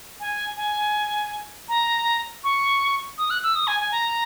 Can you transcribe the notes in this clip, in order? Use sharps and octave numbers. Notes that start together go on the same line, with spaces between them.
G#5
G#5
A#5
C#6
D#6
F#6
E6
D#6
G#5
G#5
A#5